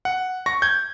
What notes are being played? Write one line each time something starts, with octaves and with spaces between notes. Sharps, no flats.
F#5
C#6 A#6
G6 G#6